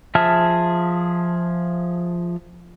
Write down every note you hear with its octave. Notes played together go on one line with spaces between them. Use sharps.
F3 G#4 E5 A5 F6